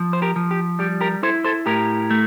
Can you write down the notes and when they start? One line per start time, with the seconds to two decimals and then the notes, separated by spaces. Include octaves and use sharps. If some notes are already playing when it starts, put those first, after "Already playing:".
Already playing: F3
0.13 C5
0.22 G4 A#4
0.36 F3
0.51 G4
0.79 G3 G4
1.01 G4 A#4
1.23 E4 A4 C5
1.44 A4 C5
1.66 A2 G4 A#4
2.10 A3